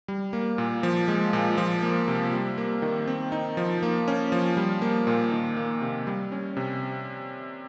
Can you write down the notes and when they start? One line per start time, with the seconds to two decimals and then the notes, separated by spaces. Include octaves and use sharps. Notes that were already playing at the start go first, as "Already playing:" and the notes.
0.08 G3
0.33 A#3
0.58 A#2
0.83 F3
1.08 G#3
1.33 A#2
1.58 F3
1.83 A#3
2.08 C3
2.33 G3
2.58 A#3
2.82 D#3
3.07 C4
3.32 D#4
3.57 F3
3.83 A#3
4.08 C#4
4.32 F3
4.57 G3
4.82 A#3
5.07 A#2
5.32 D#3
5.57 A#3
5.82 C3
6.07 G3
6.32 C#4
6.57 C3